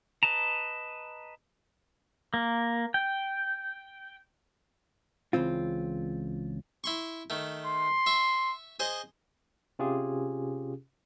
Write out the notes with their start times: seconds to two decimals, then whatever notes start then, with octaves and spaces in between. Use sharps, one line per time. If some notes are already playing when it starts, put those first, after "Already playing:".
0.23 B4 D#5 A5 A#5
2.34 A#3
2.94 G5
5.33 C#2 E3 C4 F4
6.84 E4 C6 C#6
7.30 D#3 A3
7.66 C6
8.06 E5 C#6
8.80 G#4 C5 D#5
9.79 C3 C#4 F4 G4 G#4